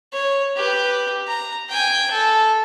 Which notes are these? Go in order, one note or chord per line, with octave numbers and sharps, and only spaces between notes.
C#5
G4 B4
A#5
G5 G#5
A4